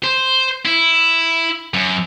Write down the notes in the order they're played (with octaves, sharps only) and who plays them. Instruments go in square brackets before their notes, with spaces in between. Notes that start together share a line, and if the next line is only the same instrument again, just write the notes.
[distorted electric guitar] C5
E4
F#2